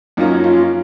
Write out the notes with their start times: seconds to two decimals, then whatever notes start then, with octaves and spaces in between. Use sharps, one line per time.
0.17 F#2 F3 A#3 C#4 D#4
0.44 F4